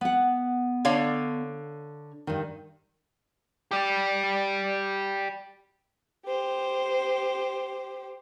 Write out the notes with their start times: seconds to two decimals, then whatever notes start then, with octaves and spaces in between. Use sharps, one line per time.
0.01 B3 F#5
0.85 D3 C#5 F5
2.27 G2 D#3
3.71 G4 D5
6.25 G4 C5